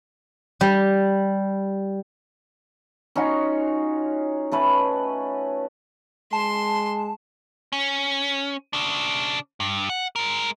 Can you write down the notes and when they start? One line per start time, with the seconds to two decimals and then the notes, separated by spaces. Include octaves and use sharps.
0.61 G3
3.16 C#4 D#4 F4 F#4
4.52 A3 C#4 B4
6.33 G#3 A5 C6
7.73 C#4
8.73 C#3 D4
9.60 G2
9.89 F#5
10.16 G#3 A#4